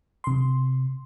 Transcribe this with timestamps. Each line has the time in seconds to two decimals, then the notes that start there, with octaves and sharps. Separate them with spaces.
0.24 C3 C6